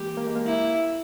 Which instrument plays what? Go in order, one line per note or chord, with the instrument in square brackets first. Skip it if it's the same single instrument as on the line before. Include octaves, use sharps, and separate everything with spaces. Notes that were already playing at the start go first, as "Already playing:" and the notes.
Already playing: [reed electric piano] E3 G#3 A#3 [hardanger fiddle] G4
[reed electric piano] A#3
G#3
A#3
[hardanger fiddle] E4